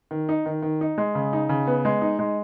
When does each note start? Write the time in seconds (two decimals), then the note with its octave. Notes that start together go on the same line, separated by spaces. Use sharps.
0.11 D#3
0.29 D#4
0.46 D#3
0.63 D#3
0.81 D#4
0.98 G#3
1.15 C#3
1.33 D#4
1.49 C#3
1.67 B3
1.85 G#3
2.02 D#4
2.19 G#3